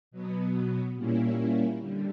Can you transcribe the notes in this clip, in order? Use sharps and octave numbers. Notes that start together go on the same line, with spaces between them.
B2 F#3 B3
A#2 G3 A#3 C#4 E4
D3 G3